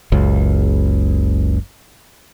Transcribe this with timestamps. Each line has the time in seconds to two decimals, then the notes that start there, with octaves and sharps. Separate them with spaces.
0.12 F#1 C#2